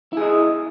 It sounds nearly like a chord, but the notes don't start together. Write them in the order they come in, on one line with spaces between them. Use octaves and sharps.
E4 G#4 D#5